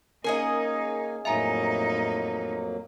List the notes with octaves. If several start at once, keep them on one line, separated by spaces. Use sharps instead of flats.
A#3 C#4 D#4 G#4 A#4 D#5 G#5
F2 A2 F#3 A#3 D#4 E5 G#5 A#5